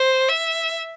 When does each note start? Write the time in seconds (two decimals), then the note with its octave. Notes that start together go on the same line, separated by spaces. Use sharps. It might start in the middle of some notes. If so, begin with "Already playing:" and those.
Already playing: C5
0.29 E5